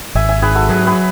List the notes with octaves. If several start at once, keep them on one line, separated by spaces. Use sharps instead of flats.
G#1 E5 G#5
E5 G#5
G#2 G#4 B4
F#4 A4
F#3 G#4 B4
G#4 B4